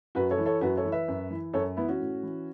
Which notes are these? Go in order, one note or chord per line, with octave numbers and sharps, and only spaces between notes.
F#2 F#4 B4
A4 C#5
E3
A4 C#5
F#2 F#4 B4
A4 C#5
E3
B4 E5
F#2
E3
F#2 A4 C#5
E3 B3 E4
C#4 F#4
A2
E3